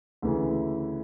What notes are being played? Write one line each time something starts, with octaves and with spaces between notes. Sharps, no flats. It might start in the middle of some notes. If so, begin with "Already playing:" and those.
D2 C#3 E3